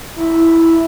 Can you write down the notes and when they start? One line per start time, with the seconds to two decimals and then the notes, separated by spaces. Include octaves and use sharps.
0.16 E4